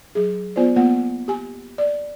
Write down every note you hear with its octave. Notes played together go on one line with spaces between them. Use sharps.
F#3 G#4
B3 F4 C5 D5
A#3 B3 F4 F#5
G4 G#5
D5